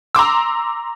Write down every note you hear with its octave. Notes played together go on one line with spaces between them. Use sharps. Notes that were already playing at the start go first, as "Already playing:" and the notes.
A#5 C6 D6 E6